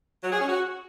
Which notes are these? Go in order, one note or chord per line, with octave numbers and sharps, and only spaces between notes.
F#3
G#4
C#4
F#4